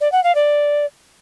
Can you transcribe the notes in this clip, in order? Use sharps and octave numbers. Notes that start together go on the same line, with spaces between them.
D5
F#5
F5
D5